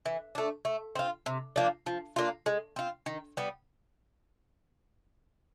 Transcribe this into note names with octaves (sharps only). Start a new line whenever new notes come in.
E3
A3 D4
A3
C4 F4
C3
F3 A#3 D4
F3
A#3 D4 F4
G#3
C4 F4
D#3
G3 B3